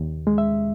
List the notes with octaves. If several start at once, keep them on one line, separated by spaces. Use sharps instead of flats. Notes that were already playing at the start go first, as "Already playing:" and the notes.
Already playing: D#2
G#3
E5